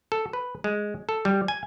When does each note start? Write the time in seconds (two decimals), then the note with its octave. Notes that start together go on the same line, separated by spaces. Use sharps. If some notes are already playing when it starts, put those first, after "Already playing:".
0.12 A4
0.33 B4
0.64 G#3
1.09 A4
1.25 G3
1.48 G#5